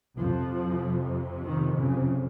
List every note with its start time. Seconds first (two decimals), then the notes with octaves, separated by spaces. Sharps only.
0.17 F2 C3 F3
1.44 D#3
1.77 C#3